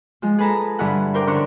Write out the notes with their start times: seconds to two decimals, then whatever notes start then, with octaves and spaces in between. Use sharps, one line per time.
0.22 F3 G#3
0.39 G#4 A4 B4 A5 A#5
0.79 G2 D3 E3 E4 F#5
1.14 A#4 C5 G5 D6
1.27 D3 C#4 C5 C#6 D6 F#6